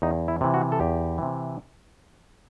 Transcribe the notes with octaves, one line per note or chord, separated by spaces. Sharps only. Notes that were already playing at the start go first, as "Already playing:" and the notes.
E2 D#4
E4
C3 E3
F#4
A4
E2 G4
C3 E3